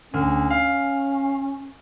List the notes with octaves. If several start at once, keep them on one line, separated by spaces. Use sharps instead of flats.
D2 C#4
F5